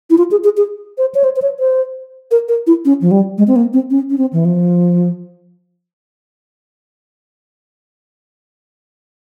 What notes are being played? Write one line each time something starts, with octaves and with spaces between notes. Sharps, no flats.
E4
F4
G#4
G#4
G#4
C5
C#5
C5
C5
C#5
C5
A#4
A#4
E4
C#4
F3
G3
G#3
C4
A#3
C4
C#4
C#4
C4
E3
F3